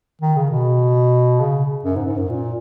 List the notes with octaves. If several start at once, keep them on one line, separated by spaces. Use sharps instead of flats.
D#3
C#3
B2
C#3
F#2
G#2
G#2
F#2
A#2